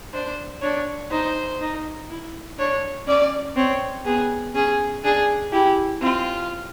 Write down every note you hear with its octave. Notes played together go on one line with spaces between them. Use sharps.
D4 C5
D4 C#5
D#4 C5
D#4
E4
D4 C#5
C#4 D5
C4 C#5
B3 G#4
C#4 G#4
D4 G#4
E4 G4
C4 F4